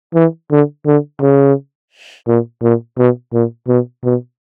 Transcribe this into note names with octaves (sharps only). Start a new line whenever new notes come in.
E3
D3
D3
C#3
A#2
A#2
B2
A#2
B2
B2